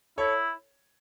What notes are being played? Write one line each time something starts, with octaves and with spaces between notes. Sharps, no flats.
E4 A4 C#5